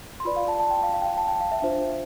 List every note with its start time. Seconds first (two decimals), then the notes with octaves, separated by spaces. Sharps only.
0.20 C6
0.25 F4 B4 D5 B5
0.36 F5
0.48 A5
0.60 A5
0.71 G5
0.83 F5
0.94 F5
1.02 G5
1.05 F5
1.18 A5
1.28 G5
1.40 F5
1.52 E5
1.62 D4 F4 C5